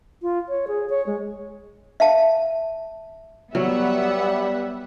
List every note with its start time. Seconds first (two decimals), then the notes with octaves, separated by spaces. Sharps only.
0.22 F4
0.49 C#5
0.68 G#4
0.90 C#5
1.06 G#3
2.00 E5 F5 A5
3.55 F#3 G3 B3 E5 F#5